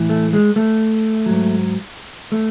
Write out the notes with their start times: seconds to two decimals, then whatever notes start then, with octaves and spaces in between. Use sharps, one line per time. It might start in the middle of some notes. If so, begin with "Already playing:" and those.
Already playing: A2 E3
0.09 A3
0.33 G#3
0.56 A3
1.26 G#2 F#3
2.32 A3